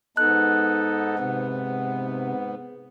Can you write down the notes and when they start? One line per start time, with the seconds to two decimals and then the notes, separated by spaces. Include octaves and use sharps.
0.17 G#2 B3 D#4 A4 F#6
1.19 C3